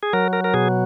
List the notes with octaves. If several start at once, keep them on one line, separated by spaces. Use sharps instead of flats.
G#4
F#3 A#4
A#4
A#4
B2 G#4